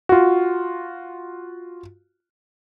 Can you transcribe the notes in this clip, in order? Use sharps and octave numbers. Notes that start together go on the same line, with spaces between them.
F4 F#4